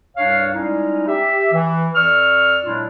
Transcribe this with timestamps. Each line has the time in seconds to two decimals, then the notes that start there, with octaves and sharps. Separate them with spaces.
0.17 C2 G2 D4 C#5 F5
0.55 G3 G#3 C#4 D#4 E4
1.07 G4 E5
1.53 E3
1.96 F2 D5 C#6 E6 F6
2.65 A#2 F#3 G#3 D4 E4 F4